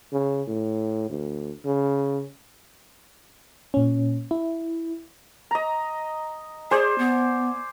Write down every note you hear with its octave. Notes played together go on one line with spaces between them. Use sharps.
C#3
A2
D2
C#3
A#2 C#4
E4
D#5 A#5
G#4 C5 D5 G#5
B3